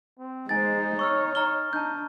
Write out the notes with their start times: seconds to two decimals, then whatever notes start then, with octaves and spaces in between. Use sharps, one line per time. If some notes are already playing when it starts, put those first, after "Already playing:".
0.19 C4
0.49 G#3 D#4 C5 G#5 A6
0.99 C#5 C#6 E6 F6
1.35 D#4 A#5 F6 G7
1.73 D4 D#4 A5 G6